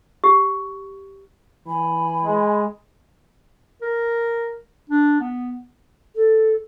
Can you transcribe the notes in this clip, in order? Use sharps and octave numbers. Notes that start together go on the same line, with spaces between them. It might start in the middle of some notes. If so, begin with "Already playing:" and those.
G4
E3 G#5 B5
G#3
A#4
D4
B3
A4